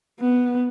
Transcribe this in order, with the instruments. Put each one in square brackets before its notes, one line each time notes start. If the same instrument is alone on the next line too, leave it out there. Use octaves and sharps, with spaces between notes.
[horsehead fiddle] B3